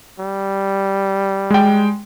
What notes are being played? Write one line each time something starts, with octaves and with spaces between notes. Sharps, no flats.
G3
G#3 G5